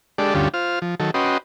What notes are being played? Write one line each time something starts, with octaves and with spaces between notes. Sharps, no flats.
G#3 D4 G4 A4 D5
D2 G2 D3 C#4 F4 G4
F4 C5 F6
F3
D#3 F#3 A4
C#4 F#4 B4 D#5 G5 C6